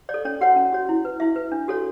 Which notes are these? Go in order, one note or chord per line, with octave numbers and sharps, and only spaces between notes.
C#5 D5
A4
C#4 C#5
F#4 C#5 F#5
C#4
F#4 C#5
E4
B4
E4 E5
B4
D4
F#4 A4 C#5